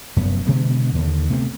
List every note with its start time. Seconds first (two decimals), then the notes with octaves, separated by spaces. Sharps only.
0.16 F1 F#2 B3
0.47 B2 D3 G#3 B3
0.95 D#2 D3
1.30 C3 A3 B3 C4